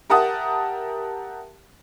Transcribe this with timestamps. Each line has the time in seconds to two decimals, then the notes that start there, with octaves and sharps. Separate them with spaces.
0.10 G4 A#4 E5 F#5 A5 D#6